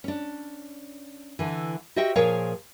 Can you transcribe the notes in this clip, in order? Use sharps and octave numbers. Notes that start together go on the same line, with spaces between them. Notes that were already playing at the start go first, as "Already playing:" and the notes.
C#4 D4
D3 E3
F#4 G4 C5 D#5 E5 G5
A#2 F3 G#4 A#4 C#5 F5